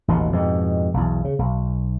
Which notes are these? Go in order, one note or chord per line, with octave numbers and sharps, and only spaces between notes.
A1 D#2 B2
F2 G#2 B2
B1 E2
C#3
B1